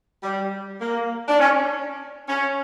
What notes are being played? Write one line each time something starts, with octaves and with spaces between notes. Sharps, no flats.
G3
A#3
D4
C#4
C#4